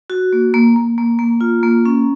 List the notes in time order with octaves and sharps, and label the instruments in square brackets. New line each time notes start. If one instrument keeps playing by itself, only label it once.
[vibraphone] F#4
A#3
A#3
A#3
A#3
A#3
F4
A#3
C#4